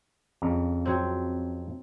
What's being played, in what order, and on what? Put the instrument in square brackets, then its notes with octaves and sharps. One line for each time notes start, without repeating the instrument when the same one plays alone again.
[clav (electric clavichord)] F2 C#3 A#5
[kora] F#3 C4